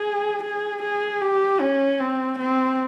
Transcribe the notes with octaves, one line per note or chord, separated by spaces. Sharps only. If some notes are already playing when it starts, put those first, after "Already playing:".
Already playing: G#4
G#4
G#4
G4
C#4
C4
C4